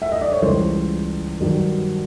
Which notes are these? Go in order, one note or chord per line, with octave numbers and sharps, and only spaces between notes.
E5
D#5
D5
C#5
C#2 C#3 E3 G3 C5
G2 D#3 F#3